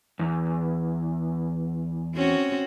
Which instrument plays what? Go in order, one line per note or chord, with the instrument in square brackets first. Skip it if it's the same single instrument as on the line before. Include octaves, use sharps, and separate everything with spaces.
[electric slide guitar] E2
[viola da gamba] C4 C#4 F#4